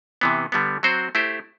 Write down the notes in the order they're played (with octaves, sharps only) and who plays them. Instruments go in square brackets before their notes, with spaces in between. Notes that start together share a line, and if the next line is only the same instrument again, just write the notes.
[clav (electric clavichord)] C3 E3 B3
D3 G3 B3
F#3 C4 F#4 C5
A3 E4 G4 C5